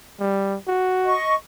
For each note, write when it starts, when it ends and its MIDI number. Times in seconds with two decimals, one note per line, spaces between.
0.20 0.57 55
0.67 1.15 66
1.05 1.34 75
1.05 1.34 85